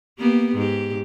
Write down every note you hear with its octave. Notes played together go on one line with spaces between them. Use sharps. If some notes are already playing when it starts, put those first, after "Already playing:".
A#3 B3 G4
G#2 G4